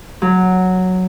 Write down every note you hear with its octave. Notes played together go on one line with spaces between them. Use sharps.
F#3